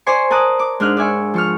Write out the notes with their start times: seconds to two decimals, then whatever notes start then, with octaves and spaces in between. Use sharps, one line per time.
0.06 C5 D5 G#5 C6 C#6
0.30 A#4 D5 A5 D#6 F#6
0.59 D6
0.80 G#2 D4 D#4 F6 F#6
0.97 D5 E5 G#5 C#6
1.34 F3 C#6 F6